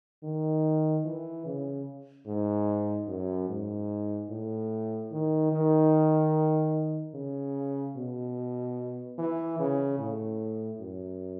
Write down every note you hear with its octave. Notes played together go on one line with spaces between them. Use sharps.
D#3
E3
C#3
G#2
F#2
G#2
A2
D#3
D#3
C#3
B2
E3
C#3
A2
F#2